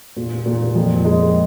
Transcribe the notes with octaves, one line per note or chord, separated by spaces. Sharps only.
A#2
A#2
F2
G#3